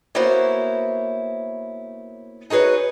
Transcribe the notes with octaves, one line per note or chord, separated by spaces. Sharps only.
A#3 B3 E4 F#4 C5 C#5
D#4 F#4 G#4 B4 C#5